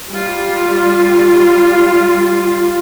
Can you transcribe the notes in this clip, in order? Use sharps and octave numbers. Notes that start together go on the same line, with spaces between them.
G3 F4